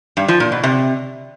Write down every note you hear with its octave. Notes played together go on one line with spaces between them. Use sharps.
G2
F3
A#2
B2
C3